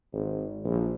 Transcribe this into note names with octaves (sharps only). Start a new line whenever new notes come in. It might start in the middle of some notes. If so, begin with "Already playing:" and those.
G#1
A#1